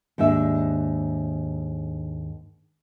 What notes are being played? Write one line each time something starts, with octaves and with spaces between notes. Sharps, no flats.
D#2 G#2 D4 E5